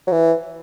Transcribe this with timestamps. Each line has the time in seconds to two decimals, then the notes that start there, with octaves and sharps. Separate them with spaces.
0.07 F#3
0.12 E3